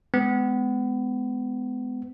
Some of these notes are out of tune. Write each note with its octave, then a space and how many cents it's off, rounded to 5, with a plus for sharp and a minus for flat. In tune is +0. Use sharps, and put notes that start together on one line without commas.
G#3 +15 B3 +30